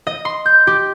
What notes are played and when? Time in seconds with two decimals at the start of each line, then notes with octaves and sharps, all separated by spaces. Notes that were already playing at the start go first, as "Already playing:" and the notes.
0.07 D#5
0.25 C6
0.46 G6
0.67 G4